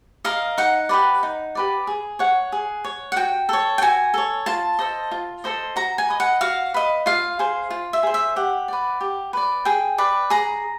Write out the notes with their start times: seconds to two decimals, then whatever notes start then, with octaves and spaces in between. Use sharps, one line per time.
0.25 A#4 D#5 F5
0.58 D#4 F#5
0.89 G4 B4 D5
1.23 D#4
1.55 G4 B4 D5
1.87 G#4
2.19 C#5 F#5
2.52 G#4
2.84 C#5
3.12 F#5
3.16 F#4 G5
3.49 A4 C#5
3.78 G5
3.82 F#4 G#5
4.14 A4 C#5
4.46 F4 A5
4.79 A4 C5 D#5
5.11 F4
5.44 A4 C5 D#5
5.76 F#4 A#5
5.98 G#5
6.09 B4 D#5
6.20 F#5
6.41 F#4 F5
6.74 B4 D#5
7.06 F4 F5
7.39 G#4 C5
7.70 F4
7.93 E5
8.03 G#4 C5
8.14 E5
8.36 G4 F#5
8.68 B4 D5
9.01 G4
9.33 B4 D5
9.65 G#4 G5
9.98 B4 D5
10.30 G#4 A#5